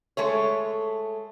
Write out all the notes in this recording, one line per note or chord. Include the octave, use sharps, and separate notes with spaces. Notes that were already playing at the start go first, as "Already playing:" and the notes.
G#3 A3 C#5